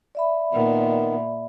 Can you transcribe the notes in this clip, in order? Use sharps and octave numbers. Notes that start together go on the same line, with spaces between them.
D5 E5 B5
A#2 D#3 B3